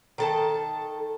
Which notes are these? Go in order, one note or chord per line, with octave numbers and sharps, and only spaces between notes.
D#3 A4 A5